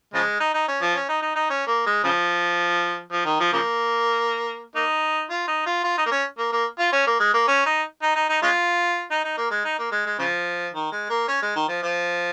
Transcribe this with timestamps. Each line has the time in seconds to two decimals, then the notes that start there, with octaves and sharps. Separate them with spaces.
0.14 C#3 F3 G#3
0.40 D#4
0.54 D#4
0.68 C#4
0.82 F3
0.95 C#4
1.09 D#4
1.22 D#4
1.36 D#4
1.50 C#4
1.67 A#3
1.86 G#3
2.04 C#3 F3
3.13 F3
3.25 D#3
3.40 F3
3.53 C#3 F3 A#3
4.75 A#3 D#4
5.30 F4
5.47 D#4
5.66 F4
5.84 F4
5.98 D#4
6.06 A#3
6.12 C#4
6.38 A#3
6.53 A#3
6.79 F4
6.93 C#4
7.07 A#3
7.20 G#3
7.34 A#3
7.48 C#4
7.66 D#4
8.02 D#4
8.16 D#4
8.29 D#4
8.42 G#3 C#4 F4
9.11 D#4
9.24 D#4
9.37 A#3
9.51 G#3
9.64 D#4
9.79 A#3
9.92 G#3
10.06 G#3
10.19 C#3 F3
10.74 D#3
10.92 G#3
11.09 A#3
11.28 C#4
11.42 G#3
11.55 D#3
11.68 F3
11.83 F3